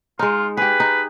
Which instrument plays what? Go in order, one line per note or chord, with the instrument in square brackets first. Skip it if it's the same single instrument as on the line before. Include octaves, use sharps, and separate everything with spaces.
[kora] G#3 D#4 [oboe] F4
[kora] G4 G#4 [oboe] B4
[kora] D#4